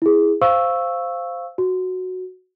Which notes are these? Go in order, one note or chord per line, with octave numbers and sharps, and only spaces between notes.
E4 G#4
C5 F5 C#6 E6
F#4